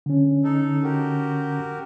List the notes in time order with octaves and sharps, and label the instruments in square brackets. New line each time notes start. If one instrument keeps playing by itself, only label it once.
[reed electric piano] D3 C#4
[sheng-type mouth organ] D#4 A4
F#4 G4 A#4